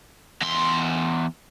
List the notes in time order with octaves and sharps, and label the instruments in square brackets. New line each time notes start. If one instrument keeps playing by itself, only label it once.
[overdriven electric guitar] E2 C6